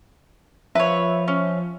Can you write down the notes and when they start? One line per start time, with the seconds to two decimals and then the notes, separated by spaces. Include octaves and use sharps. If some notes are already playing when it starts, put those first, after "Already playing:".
0.75 F3 B4 C#5 E5
1.28 C#4